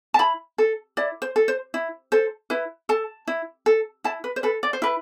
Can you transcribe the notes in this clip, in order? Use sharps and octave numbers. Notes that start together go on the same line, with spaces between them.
A5
E4 B5
A4
E4 D5
C5
A4
C5
E4
A4 C5
E4 B4
A4 A5
E4
A4
E4 A5
B4
C5
A4 B4
D5
C5
E4 B4